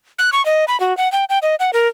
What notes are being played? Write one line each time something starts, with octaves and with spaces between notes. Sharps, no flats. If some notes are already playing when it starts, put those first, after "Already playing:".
F#6
C#6
D#5
B5
F#4
F#5
G5
G5
D#5
F#5
A#4